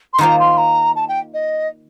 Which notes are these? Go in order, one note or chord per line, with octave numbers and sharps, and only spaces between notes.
C6
D#3 A#3 F4 C5 A#5
C6
A#5
A5
G5
D#5